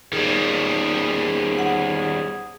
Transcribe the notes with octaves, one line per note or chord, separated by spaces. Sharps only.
E2 G#2 D#3 G3 G#4
F#5